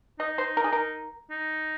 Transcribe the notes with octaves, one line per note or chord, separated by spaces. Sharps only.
D#4 D#5
C5
A#4
G#4
A#4
D#4